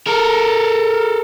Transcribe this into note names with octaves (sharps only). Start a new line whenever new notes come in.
A4 A#4